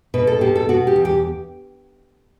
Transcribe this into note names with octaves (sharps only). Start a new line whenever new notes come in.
B2 B4
A4
B2 G4
A4
B2 F#4
G4
E2
G4